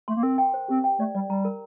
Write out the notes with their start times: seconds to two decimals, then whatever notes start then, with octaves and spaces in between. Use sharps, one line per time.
0.08 A3 C6
0.17 A#3
0.23 C4 A#4
0.38 G5
0.54 C5
0.68 C4 G4
0.84 G5
0.99 A3 D5
1.15 G3 D5
1.29 G3 A#5
1.45 A#4